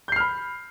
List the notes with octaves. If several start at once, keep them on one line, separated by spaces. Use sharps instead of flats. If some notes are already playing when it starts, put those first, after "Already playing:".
B5 F6 G6 C7